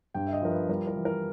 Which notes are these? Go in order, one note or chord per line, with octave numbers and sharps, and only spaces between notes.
G2 G5
E5
D#5
F3 A#4
B4
G3 A#4
A#4
E3
A#4